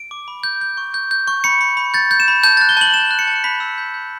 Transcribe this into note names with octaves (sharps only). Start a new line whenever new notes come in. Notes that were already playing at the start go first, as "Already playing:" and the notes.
Already playing: D7
D6
B5
G6
G6
C#6
G6
G6
C#6
B5 C#7
B5
B5
G6 A6
G6
E7
B5
A5 G6
A6
F#6
G7
A5 F#7
A5 E7
F#6
C#7
A5
B5 B6
E6
G6
G6